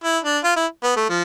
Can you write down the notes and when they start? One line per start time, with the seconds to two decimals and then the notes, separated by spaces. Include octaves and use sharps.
0.04 E4
0.24 D4
0.44 F4
0.57 E4
0.83 B3
0.96 A3
1.09 F3